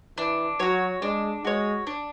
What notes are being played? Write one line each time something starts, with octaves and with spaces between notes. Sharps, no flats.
E3 D4
F#3 F#4 C#5
G#3 D4
G#3 F#4 C#5
D4